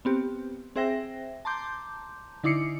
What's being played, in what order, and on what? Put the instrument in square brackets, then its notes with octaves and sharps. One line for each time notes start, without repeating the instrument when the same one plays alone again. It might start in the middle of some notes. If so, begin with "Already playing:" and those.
[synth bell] B3 C4 G4
C4 G#4 C5 E5 G5 A#6
A5 A#5 C6 D6 G6
D3 D#4 E4 D6 C7 C#7